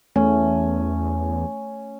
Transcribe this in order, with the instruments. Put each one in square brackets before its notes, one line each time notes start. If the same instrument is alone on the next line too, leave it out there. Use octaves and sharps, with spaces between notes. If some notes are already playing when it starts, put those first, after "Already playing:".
[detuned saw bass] E2 [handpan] A3 [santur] C#4